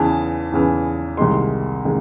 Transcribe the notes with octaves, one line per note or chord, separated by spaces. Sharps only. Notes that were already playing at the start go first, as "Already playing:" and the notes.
Already playing: E2 C#3 E3 A5
E2 C#3 E3
C2 C3 D#3 G#3 C6
C3 D#3 G#3